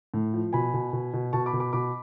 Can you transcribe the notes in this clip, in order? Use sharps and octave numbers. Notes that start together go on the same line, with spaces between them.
A2
F3
B2 G#5 B5
B2
B2
B2
B2 A5 C#6
B5 D6
B2
B5 D6
B2 B5 D6